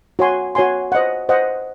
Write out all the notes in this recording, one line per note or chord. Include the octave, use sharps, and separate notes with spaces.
F#4 C#5 G#5 C6
F#4 C#5 G#5 C6
C5 D#5 F#5
C5 D#5 F#5